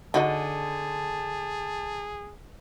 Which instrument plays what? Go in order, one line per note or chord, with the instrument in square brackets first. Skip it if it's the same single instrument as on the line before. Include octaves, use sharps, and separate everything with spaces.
[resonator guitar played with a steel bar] D3 [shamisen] D#4 F#4 D#5 [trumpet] G#4 [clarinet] A5